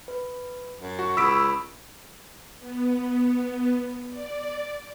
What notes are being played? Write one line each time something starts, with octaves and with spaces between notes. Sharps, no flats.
B4
F#2
F#4 C#6
C#2 B5 D#6 E6 B6 D7
B3
D5